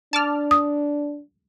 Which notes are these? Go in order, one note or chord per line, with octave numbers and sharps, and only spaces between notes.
D4 A5 D6 F6
D#6